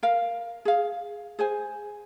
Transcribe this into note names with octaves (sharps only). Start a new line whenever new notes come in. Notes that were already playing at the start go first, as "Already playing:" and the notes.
A#4 F5
G#4 F5
G#4 C5 G#5